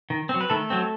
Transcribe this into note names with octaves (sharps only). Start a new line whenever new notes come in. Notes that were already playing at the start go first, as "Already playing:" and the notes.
D#3
F#3 C4
B4
D#3 A3 A4
F#3 C4